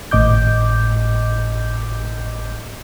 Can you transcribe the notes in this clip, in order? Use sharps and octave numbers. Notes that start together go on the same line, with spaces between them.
G#1 A2 D#5 D6 G6